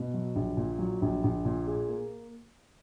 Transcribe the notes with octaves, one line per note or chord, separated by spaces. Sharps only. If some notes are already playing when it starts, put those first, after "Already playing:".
Already playing: B2
F#3
A#1
A#2
F#3
A#1
A#1
A#2
G#4
A#3